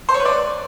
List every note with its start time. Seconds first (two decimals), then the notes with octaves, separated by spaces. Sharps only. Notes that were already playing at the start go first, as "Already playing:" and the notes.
0.09 C5
0.14 C#5
0.20 B4
0.25 D5